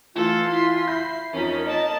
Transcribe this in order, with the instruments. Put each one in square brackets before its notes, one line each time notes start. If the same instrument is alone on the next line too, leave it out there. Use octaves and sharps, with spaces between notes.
[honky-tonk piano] E3 [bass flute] A3 [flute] F4 [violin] A4
[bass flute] E4 [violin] C6 B6
[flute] E5 [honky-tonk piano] B5 G6 A#6 [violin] C7
[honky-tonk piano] F2 F3 [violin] C#4 B6 [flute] D#4 [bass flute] A#4
[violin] A#3 A5 [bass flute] D#5